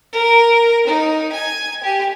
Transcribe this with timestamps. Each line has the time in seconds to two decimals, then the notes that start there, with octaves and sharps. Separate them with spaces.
0.12 A#4
0.87 D#4
1.32 G#5
1.83 G4